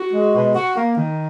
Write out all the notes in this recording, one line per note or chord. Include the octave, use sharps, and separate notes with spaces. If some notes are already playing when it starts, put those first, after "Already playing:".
Already playing: F#4
G#3
B2
F#4
A#3
D#3